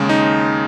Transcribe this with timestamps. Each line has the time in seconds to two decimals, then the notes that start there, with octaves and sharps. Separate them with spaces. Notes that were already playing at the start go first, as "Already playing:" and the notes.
Already playing: D#2 C#3 G#3
0.09 D#4